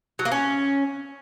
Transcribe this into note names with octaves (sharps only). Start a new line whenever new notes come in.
F#3
A#3
C#4